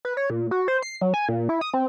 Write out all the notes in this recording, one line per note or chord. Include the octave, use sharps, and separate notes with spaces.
B4
C#5
A#2
F#4
C5
C7
F#3
G#5
A#2
E4
D#6
C4